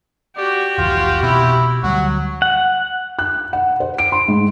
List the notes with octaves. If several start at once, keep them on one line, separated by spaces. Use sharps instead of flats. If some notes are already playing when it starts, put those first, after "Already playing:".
F#4 G4 D5
F1 C2 E3 F4
B2 C4 E4
D2 F#3 G3 F#4
F#5
F#6
F#5
C5
D7
C6
G#2